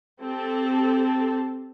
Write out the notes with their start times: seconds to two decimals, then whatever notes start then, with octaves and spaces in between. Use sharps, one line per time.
0.22 C4 G4 A4 A5